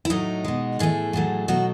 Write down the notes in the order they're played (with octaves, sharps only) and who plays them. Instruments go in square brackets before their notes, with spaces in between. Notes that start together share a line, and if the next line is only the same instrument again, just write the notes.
[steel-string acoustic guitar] E4
A2 F#3 A3 D#4
B2 G#3
A2 E3 A3 G#4
A2 F#3 A3
B2 F#3 A3 F#4